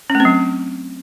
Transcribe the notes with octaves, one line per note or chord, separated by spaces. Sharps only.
C#4
A3
C4
F#3